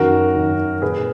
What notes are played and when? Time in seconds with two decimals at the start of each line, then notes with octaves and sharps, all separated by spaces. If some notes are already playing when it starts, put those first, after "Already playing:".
Already playing: F#2 D#3 F#4 A#4
0.35 F#2 D#3
0.82 A#2 G#4 B4